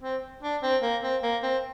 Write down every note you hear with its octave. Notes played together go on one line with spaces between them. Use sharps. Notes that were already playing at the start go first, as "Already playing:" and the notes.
C4
D4
C4
A#3
C4
A#3
C4